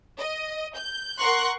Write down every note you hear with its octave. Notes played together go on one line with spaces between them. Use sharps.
D#5
G6
A#4 F#5 C6 C#6 F#6